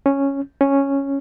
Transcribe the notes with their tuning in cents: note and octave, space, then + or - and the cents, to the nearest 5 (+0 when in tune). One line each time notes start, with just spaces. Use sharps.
C#4 -5
C#4 -5